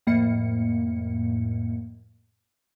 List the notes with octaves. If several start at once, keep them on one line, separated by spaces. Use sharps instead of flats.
F2 A2 A#3 C#7